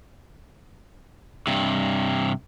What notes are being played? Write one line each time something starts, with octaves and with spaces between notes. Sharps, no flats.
G2 C3